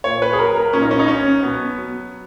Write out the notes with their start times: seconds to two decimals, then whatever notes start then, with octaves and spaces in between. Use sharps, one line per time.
0.04 A#2 C#5
0.22 B4
0.33 G#4
0.38 F#3 A#4
0.56 A#4
0.73 A#2 C#4
0.82 D#4
0.91 C#4
0.99 D#4
1.08 F#3 C#4
1.43 B2 B3
1.78 F#3